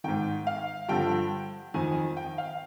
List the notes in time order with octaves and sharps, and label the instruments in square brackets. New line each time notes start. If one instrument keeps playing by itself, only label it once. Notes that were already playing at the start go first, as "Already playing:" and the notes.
[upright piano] G#2 D#3 G5
F5
G2 D3 F3 G5
F2 D#3 G#5
G5
F5